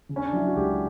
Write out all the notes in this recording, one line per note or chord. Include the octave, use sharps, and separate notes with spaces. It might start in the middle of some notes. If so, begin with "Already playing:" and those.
C#3
C#4
D4
F#3 E4
F#4
C#2 G4